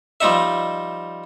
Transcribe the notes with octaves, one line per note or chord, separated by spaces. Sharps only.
F3 G3 D#4 E5